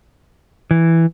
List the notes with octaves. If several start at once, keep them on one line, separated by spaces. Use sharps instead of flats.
E3